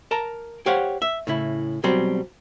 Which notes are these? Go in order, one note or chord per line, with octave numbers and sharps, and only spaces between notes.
A#4 A5 A#5
G4 C5 C#5 F5 F#5
E5
A2 C#3 E4
B2 F#3 G3 C4